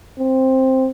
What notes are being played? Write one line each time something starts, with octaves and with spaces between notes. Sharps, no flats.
C4